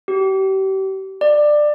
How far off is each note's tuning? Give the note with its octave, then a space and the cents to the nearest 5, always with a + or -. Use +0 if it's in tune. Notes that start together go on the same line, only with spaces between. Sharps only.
G4 -35
D5 +20